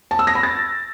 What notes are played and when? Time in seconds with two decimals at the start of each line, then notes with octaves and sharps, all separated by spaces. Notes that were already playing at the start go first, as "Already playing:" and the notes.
0.11 A5
0.19 E6
0.27 A#6
0.35 B5
0.43 A6